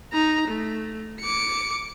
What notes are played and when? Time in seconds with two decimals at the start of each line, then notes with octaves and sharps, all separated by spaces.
0.12 D#4 A#5
0.48 A3
1.20 D6 C#7